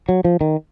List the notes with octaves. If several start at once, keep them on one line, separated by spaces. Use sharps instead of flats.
F#3
F3
D#3